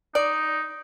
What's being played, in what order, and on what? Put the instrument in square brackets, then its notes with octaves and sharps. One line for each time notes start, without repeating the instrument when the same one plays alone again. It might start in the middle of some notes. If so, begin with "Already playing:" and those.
[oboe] D#4 [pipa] D5